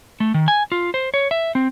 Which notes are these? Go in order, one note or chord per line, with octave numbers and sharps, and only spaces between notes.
A3
D#3
G#5
F4
C5
C#5
E5
C4